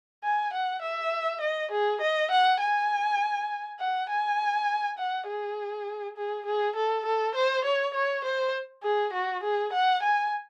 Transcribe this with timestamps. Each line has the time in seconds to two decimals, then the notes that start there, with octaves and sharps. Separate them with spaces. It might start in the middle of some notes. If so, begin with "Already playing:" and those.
0.24 G#5
0.53 F#5
0.82 E5
1.41 D#5
1.71 G#4
2.01 D#5
2.31 F#5
2.60 G#5
3.79 F#5
4.09 G#5
4.98 F#5
5.28 G#4
6.17 G#4
6.46 G#4
6.76 A4
7.06 A4
7.35 C5
7.65 C#5
7.94 C#5
8.25 C5
8.83 G#4
9.13 F#4
9.43 G#4
9.73 F#5
10.03 G#5